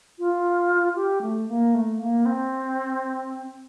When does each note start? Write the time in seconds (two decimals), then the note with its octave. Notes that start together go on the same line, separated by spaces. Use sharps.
0.19 F4
0.95 G4
1.22 A3
1.48 A#3
1.74 A3
1.99 A#3
2.26 C4